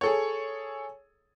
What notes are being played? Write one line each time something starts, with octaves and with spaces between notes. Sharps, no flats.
G#4 A4 C#5